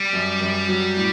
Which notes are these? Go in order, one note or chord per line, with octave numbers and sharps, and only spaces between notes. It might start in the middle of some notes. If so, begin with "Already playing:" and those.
Already playing: G3
F#2
F#2
F#3
A2